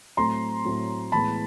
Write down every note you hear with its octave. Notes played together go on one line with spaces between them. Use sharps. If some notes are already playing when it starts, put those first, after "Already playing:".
A2 F#3 A3 C4 A#5 C6
A2 F#3 A3 C4
A2 E3 G#3 B3 A5 B5